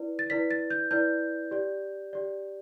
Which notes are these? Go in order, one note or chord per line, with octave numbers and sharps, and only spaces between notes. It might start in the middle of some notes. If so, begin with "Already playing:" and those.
Already playing: E4 B4 D5
A6
E4 B4 D5 B6
A6
G6
E4 B4 D5 G6
G4 D5
G4 D5